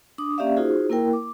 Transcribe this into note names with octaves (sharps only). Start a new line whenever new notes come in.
D4 D6 D#6
A#3 C#4 G4 D5 E5 F5
D#4 F4 F#4 G#4 C5
A#3 E4 A#4 G5
D6